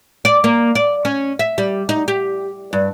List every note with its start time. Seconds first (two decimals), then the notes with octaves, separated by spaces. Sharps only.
0.25 D5
0.44 A#3
0.75 D5
1.05 C#4
1.39 E5
1.58 G3
1.89 D#4
2.08 G4
2.73 G2